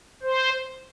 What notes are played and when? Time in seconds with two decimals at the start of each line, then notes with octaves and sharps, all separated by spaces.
0.23 C5